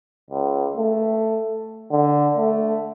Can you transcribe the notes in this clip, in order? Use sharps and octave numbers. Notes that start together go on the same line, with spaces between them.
C#2
A3
D3
A3